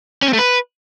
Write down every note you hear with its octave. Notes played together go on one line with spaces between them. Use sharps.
C#4
C4
A3
B4